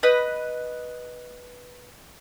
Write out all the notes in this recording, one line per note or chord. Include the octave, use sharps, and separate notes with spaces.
B4 D#5